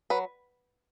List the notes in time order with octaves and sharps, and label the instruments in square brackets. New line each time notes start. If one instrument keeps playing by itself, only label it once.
[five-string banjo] F#3 B4